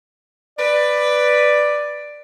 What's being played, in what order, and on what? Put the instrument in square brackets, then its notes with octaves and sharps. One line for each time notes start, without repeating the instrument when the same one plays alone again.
[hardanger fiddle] B4 [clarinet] D5